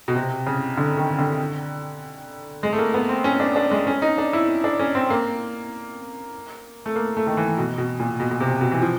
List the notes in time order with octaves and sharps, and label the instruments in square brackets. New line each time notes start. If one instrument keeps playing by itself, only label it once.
[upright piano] B2
C3
C#3
D3
D#3
D3
G#3
A3
A#3
B3
C4
C#4
D4
D4
G#3
C#4
D#4
D4
E4
D4
C#4
C4
A#3
A3
A#3
A3
D#3
E3
B2
B2
A#2
B2
B2
C3
B2
E3
F3